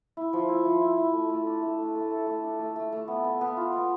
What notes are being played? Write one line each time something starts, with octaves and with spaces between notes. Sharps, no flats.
E4
F3
E4
F3
E4
E4
A3
A3
D4
A3
A3
A3
A4
A3
D4
A3
A3
A3
B3
B3
B3
F4
B3